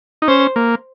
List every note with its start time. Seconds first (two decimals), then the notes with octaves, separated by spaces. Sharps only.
0.22 D#4
0.28 C#4 C5
0.56 A#3